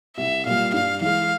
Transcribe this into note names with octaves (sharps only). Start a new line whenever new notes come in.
C2 E5
A#2 G3 F5
G2 F5
E3 G#3 F5